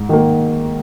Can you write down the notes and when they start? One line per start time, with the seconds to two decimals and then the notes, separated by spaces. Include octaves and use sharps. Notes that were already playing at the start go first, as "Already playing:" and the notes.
Already playing: G#2
0.09 D#3 A#3